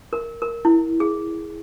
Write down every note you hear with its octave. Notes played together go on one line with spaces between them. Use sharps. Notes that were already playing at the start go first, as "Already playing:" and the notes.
A#4
A#4
E4
G#4